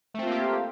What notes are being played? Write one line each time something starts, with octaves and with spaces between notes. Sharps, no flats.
A3 A#3 C4 F4 G4